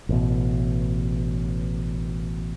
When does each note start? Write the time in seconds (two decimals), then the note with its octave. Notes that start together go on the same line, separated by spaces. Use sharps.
0.09 A1 B2